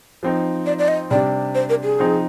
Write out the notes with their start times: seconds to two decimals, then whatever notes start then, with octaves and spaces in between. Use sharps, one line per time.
0.23 F3 C4 D#4
0.66 D5
0.79 D5
0.88 D#5
1.11 C3 G3 D4 D5
1.55 C5
1.70 A#4
1.84 G#4
1.99 F3 C4 D#4